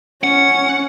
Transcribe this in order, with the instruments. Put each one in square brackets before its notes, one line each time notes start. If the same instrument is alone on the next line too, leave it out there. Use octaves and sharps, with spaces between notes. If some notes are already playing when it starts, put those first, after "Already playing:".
[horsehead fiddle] C#4 [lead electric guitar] F#5